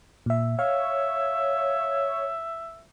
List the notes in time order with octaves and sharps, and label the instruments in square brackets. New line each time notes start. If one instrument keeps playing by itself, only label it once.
[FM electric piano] A#2 E5
[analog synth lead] C#5 [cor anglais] E5 [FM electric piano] F5